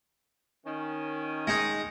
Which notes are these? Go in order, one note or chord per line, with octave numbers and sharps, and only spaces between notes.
D#3 C#4
G#3 D#4